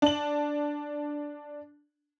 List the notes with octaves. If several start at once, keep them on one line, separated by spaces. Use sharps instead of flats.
D4 F#7